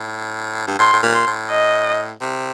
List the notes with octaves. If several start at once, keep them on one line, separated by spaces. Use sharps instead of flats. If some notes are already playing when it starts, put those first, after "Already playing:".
Already playing: A2
G2
A2 C6
A2
A#2
C6
A2
D#5
C3